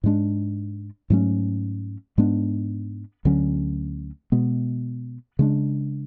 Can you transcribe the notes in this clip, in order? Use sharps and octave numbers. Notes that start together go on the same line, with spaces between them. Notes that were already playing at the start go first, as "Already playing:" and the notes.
G#2 G#3 D4
G#2 F#3 A3 C#4
G#2 G#3 B3 D4
D2 D3 F#3 C#4
B2 G#3 B3
C#3 G#3 D4